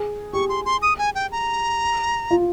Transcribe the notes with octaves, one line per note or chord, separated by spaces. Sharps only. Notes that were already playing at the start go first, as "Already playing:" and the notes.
Already playing: G#4
G4 C#6
C6
C6
D#6
G#5
G5
A#5
F4